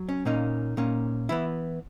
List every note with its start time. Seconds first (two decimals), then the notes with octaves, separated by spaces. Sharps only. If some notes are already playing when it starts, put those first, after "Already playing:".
Already playing: F#3
0.09 C#4
0.25 A#2 A#3 C#4 D#4
0.77 A#2 A#3 C#4
1.29 E3 B3 E4